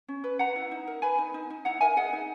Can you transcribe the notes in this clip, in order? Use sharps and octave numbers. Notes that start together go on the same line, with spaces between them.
C#4
B4
B4 F#5 A#5
E4
D#4
A#4
B4 G#5 B5
D#4
D#4
D#4
E4 F#5 A#5
A#4 E5 G#5
G#4 D#5 F#5
D#4